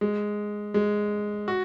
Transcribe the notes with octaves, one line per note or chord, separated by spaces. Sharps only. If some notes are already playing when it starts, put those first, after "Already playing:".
G#3
G#3
F#4